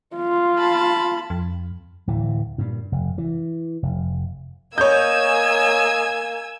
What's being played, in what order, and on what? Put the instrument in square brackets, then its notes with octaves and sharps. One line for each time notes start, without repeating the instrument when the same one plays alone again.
[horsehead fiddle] F4
[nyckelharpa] A5 B5
[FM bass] F2
[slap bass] D1 E3
G2 A#2
F1
E3
F1
[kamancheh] A#3 [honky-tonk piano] C#5 G6 [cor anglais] D#5 [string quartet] G#5 E6 G#6